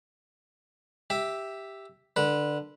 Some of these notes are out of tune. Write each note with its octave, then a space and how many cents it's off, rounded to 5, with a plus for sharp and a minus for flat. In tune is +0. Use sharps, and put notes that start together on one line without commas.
G4 +0 E5 +0
D3 +10 B4 -15